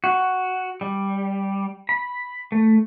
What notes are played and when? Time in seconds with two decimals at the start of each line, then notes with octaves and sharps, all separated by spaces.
0.04 F#4
0.81 G3
1.89 B5
2.52 A3